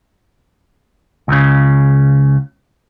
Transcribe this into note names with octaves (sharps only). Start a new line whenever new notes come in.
C#2 C#3